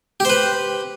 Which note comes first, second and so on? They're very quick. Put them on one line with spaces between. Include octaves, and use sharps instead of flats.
G4 C5 B4